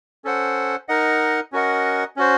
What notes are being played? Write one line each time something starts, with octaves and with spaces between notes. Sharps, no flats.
C#4 A4 C5 F#5
D#4 A#4 D#5 F#5
C#4 F#4 A#4 D#5 F#5
C#4 F#4 C5